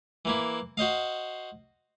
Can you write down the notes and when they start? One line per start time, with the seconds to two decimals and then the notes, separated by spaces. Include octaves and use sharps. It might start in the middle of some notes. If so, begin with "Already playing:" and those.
0.25 E3 A#3 E4
0.77 F#4 C5 D#5 F5